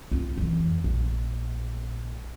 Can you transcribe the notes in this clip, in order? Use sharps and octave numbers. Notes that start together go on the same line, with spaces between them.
C4 F4
F2 E3
A#1